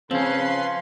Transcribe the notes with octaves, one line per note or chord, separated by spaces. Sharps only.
C#3 F3 C4 C#4 B4 C6